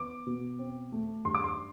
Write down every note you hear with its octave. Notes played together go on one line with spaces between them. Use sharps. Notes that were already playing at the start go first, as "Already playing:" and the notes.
Already playing: B3 D6
B2
C4
A3
G2 C6
D6
C6